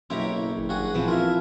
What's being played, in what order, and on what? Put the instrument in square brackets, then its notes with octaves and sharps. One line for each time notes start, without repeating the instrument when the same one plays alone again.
[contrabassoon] F#1 [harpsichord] B1 E4 [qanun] G4 C#5 A#5 [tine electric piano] C6
[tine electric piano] G#1
[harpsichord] G2 F#4 G#4
[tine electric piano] A#2 [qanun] E3 F3 C4
[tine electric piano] F4 F6 [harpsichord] A#4 E5 G#5